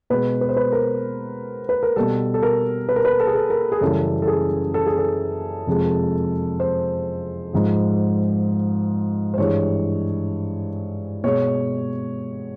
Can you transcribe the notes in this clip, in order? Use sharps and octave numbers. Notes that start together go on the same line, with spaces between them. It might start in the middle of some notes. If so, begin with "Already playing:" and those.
B2 G#3 B4
B4
C5
B4
A#4
B4
A#4
B2 G3 A4
A4
A#4
B4
A#4
B4
A4
G#4
A4
A#4
G#4
F#2 C#3 E3 G3 A4
A4
G#4
A4
G#4
A4
F2 C3 F3 G#3
C5
G#2 F3 G#3
C5
G2 E3 G#3 C#5
B2 G#3 C#5